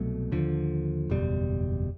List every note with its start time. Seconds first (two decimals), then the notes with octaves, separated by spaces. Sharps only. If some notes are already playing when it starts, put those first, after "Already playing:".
Already playing: C2 B2 F#3 A3
0.32 D#2 D3 F3
1.10 F#1 E2 B2 G3